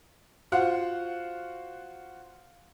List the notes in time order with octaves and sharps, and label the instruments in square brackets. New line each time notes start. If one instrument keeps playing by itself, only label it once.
[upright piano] F4 F#4 C5 F5 F#5